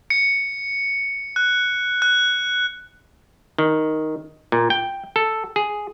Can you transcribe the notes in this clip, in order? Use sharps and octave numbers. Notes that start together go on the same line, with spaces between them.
C#7
F#6
F#6
D#3
A#2
G5
A4
G#4